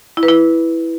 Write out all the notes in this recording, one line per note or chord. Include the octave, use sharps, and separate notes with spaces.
E4
B4
E4